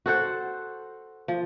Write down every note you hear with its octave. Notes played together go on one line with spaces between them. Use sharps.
F#4 A4 C5 F#5
F3